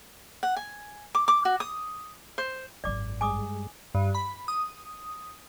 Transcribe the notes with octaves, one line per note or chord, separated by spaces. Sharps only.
F#5
G#5
D6
D6
F#4
D#6
C5
G#1 F#2 D5 D6
G2 G#3 G#5 D6 D#6
G2
B5
D#6